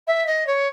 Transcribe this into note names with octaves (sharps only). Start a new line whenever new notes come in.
E5
D#5
C#5